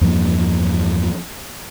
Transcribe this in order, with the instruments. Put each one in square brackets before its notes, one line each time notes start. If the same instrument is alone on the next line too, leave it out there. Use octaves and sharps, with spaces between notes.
[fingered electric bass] E2 G2 F3 A#3